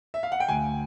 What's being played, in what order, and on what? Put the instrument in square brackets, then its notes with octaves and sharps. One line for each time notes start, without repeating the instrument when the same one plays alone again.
[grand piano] E5
F5
F#5
G5
D2 G#5